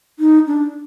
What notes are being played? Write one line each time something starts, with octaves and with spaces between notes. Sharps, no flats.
D#4
D4